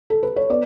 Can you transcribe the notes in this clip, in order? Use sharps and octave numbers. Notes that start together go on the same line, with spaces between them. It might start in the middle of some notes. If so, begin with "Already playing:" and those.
A4
B4
C#5
B3 D5